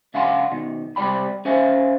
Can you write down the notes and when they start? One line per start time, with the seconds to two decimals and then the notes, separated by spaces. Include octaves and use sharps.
0.14 C#3 D4 F5 F#5 G#5 C6
0.52 B2 D#3
0.96 C3 G3 D4 D5 G5 B5
1.45 C#4 G#4 C5 E5 F5 G#5